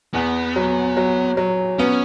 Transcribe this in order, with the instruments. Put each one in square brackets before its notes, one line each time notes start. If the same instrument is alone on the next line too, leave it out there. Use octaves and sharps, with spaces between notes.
[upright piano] E2 [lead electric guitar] B3
[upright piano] F#3
F#3
F#3
[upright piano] B3 [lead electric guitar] C#4